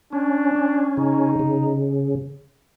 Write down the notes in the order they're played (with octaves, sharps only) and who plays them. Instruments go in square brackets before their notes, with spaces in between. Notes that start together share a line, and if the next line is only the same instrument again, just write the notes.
[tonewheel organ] C#4 [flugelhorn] D4
[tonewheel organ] C#4
[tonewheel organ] C#3 [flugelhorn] D#4
[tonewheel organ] C#3